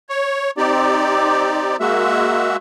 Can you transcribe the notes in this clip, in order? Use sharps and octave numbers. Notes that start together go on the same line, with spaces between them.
C#5
C4 D#4 G4 D5
G#3 A#3 F#4 E5